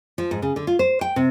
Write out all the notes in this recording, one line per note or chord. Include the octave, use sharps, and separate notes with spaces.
F3
G#2
C#3
D3
F4
C5
G5
C3